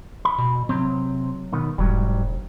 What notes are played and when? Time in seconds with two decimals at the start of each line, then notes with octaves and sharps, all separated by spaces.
0.25 B5
0.39 B2
0.69 C3 F#3 C4
1.52 B1 D#3 B3
1.78 E1 G#2 F#3 G3